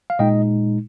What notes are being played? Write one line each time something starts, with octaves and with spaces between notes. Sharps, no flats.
F5
A#2 G#3 D#4 D#5 G5